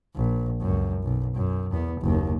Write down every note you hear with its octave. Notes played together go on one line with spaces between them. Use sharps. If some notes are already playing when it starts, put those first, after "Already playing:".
A#1
C#2 F#2
B1
F#2
E2 B3
F#1 D#2